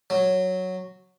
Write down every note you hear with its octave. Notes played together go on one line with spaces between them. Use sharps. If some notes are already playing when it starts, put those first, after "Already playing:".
F#3